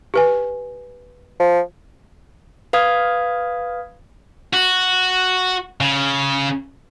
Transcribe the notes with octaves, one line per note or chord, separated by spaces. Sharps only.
G4 B4 G#5
F3
B4 F5 D#6 G#6
F#4
C#3